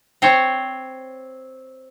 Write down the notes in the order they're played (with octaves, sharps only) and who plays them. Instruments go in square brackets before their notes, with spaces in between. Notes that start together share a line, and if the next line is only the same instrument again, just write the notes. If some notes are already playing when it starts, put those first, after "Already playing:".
[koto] C4 C5 C#5